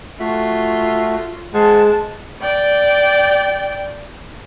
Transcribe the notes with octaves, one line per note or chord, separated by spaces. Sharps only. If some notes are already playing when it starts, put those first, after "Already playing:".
A3 F4 F#4 E5
G#3 C5 F#5 A5
D5 G5